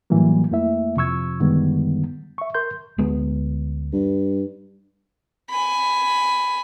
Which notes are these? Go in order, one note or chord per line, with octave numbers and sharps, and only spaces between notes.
A2 E3 F#3 G3 A#3
F2 A3 A#3 E4 E5
F2 C3 F3 C#6 E6 G#6
F#2 D3 D#3 G3 G#3 B3
E5 C#6
A#4 C6 G6
D2 G#3 B3
G2
G#5 B5